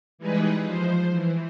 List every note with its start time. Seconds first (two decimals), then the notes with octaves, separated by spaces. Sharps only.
0.18 E3 G3 G#3 D#4 G#4 B4
0.63 F3 C5
1.11 E3